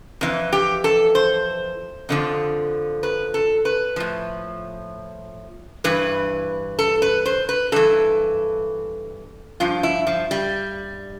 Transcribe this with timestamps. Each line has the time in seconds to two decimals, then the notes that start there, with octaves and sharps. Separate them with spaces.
0.21 F2 E3
0.52 G4
0.84 A4
1.15 C5
2.09 F2 D3 F3
3.03 B4
3.34 A4
3.65 B4
3.96 A2 F3
5.84 G2 E3 B4
6.79 A4
7.02 B4
7.26 C5
7.49 B4
7.72 G2 E3 A4
9.60 G2 F3 F4
9.83 E4
10.07 F3
10.31 G3